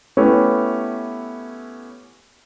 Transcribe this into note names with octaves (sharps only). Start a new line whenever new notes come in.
A3 B3 C#4 E4 G4